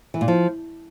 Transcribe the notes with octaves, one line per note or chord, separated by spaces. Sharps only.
E3
A#2
F3